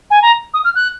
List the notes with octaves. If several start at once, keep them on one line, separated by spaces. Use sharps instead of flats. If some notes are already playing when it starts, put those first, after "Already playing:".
G#5
A#5
D#6
F6
F#6